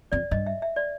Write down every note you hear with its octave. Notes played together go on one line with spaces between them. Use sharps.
F2 D5
G2 D#5
E5
E5
D5